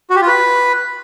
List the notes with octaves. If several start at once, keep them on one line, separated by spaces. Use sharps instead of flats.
F#4
G4
F4
B4